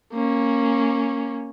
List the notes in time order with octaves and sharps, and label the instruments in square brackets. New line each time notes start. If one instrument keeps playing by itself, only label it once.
[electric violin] A#3 C#4